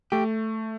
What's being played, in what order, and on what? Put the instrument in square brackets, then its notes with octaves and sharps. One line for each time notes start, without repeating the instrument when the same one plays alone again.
[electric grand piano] A3 [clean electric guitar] G4